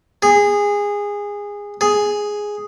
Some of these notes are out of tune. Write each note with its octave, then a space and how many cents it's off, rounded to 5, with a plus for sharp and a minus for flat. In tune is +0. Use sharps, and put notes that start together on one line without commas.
G#4 -20
G#4 +0